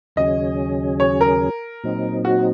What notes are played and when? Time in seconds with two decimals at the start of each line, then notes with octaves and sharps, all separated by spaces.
0.16 D#2 C#3 F#3 C#4 G#4 D#5
1.00 C#5
1.21 A#4
1.84 A#2 F#3 C4 D#4
2.25 F#4